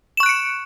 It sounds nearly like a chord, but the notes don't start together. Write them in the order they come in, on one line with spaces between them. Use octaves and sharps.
E7 C#6 F#6 D7 C#7